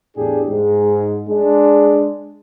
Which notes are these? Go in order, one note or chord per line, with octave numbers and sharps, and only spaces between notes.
E2 A2 D4 G4 G#4
G#2 G#3
G#3 D4